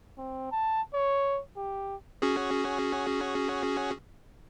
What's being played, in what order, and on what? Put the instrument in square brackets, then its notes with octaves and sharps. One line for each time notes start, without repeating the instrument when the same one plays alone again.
[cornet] C4
A5
C#5
G4
[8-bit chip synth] C#4 F#4 G#4